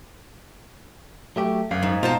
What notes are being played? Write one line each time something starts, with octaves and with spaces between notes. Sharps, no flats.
F#3 A3 G4
G1 F#2 F5
G#2
B2 F4 C5 A5 A#5